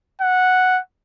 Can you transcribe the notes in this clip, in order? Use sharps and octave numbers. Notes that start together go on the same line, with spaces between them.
F#5